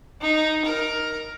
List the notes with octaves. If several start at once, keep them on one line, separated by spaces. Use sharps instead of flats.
D#4
A#4